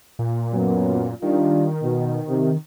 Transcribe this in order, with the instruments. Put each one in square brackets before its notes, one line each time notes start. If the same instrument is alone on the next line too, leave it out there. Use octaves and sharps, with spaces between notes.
[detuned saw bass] A#2
[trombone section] F#2 F#3 B3
[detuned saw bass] D#3 [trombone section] G3 D4 F4
[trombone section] B2
C3